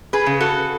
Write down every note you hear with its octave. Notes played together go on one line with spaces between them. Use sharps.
G#4 B4
C#3
F#4 A4